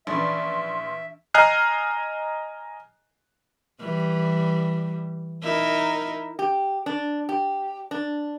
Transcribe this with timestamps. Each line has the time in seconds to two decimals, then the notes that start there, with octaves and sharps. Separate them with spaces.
0.07 A#1 E3 C#4 D4 B4 E5 C6
1.34 D#5 G#5 A#5 F6 F#6 C7
3.81 E3 G3
5.42 D#4 E4 A#4
6.39 G4
6.86 D4
7.29 G4
7.91 D4